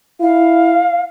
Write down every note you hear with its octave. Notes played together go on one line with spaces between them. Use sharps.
E4 F5